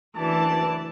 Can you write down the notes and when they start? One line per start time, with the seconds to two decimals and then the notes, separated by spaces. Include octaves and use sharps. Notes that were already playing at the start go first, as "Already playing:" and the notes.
0.16 F#1 D2 E3 D5 A5